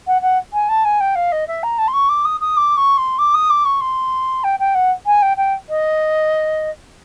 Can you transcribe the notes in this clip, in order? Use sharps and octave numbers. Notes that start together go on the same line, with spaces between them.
F#5
F#5
G#5
A5
G#5
G5
F5
D#5
E5
A#5
A5
C6
C#6
D6
D#6
D#6
D6
C#6
C6
D6
D#6
D6
C#6
C6
G5
G5
F#5
G#5
G5
G5
D#5